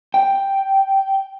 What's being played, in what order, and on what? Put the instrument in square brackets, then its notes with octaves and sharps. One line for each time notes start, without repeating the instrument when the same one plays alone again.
[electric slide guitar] G5